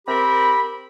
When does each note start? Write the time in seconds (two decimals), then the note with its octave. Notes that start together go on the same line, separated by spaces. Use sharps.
0.07 C4 G4 A#4 B5